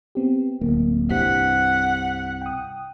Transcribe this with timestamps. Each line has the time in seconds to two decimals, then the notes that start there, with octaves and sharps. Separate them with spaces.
0.15 B3 C4 G4
0.61 D1 A#3
1.10 C2 G2 C3 F#5 B6
2.42 G5 D#6